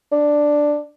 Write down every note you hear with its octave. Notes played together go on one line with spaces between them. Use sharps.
D4